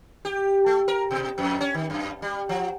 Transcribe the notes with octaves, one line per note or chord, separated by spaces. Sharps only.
G4
A3
A#4
B2
F2
C#4
D#3
F#2
G3
F3